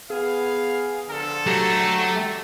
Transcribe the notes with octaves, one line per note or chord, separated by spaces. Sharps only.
B3 G#4 F5
D3 F3 A4
F#3 A3 G4